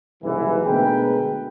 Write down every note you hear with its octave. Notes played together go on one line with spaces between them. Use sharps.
F#1 C2 G#2 E3
D2 B2 G#3 A#4 B4 G5